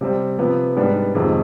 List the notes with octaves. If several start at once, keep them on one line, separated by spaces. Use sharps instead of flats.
C3 G3 C4
C3 F3 B3
G#2 G3 B3 D4
F2 C3 D#3 G#3